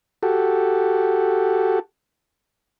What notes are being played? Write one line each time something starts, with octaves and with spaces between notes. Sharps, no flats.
F#4 G4 A4